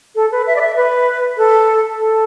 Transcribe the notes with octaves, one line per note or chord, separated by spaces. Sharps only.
A4
B4
E5
D5
E5
B4
A4
A4